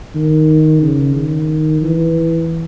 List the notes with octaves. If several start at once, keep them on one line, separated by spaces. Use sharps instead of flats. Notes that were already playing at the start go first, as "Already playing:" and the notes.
D#3
C#3
D#3
E3